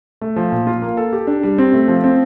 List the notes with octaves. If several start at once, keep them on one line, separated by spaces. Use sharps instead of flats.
A3
F3
A#2
F4
A#3
A4
G4
D4
G3
C4
A3
F3
C4